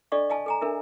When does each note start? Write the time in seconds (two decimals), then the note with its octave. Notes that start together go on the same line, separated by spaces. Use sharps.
0.12 D4 A4 D5 D#5 F5 C#6
0.30 D#5 F5 G#5 A5
0.46 A4 G#5 A#5
0.61 D4 A4 A#4 E5